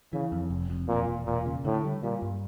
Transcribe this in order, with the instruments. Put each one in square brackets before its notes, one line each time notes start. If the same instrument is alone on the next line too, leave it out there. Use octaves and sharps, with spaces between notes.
[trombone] C#3 [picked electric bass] E3
[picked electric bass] F2
F1
F2
[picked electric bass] E1 [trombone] A#2
[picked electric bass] E1
[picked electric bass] E1 [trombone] A#2
[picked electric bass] C#3
[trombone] A2 [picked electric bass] D3
[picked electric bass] G3
[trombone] A#2 [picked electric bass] G3
[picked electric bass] G2